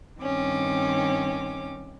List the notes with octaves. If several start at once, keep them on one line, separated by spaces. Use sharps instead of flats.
G2 D#3 C4 C#4 D6